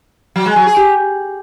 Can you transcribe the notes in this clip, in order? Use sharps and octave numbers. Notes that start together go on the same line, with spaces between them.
F#3
G#3
F#3
G#4
G4